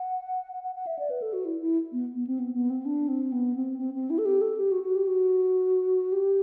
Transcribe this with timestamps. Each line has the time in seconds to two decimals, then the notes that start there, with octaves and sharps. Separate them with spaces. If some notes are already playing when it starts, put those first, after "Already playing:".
Already playing: F#5
0.52 F#5
0.63 F#5
0.75 F#5
0.87 E5
0.99 D5
1.10 B4
1.22 A4
1.33 F#4
1.45 E4
1.61 E4
1.92 B3
2.15 B3
2.27 C4
2.39 B3
2.54 B3
2.70 C4
2.85 D4
3.08 C4
3.32 B3
3.56 C4
3.78 C4
3.94 C4
4.10 E4
4.18 A4
4.25 G4
4.41 A4
4.57 G4
4.71 F#4
4.83 F#4
4.95 G4
5.07 F#4
6.12 G4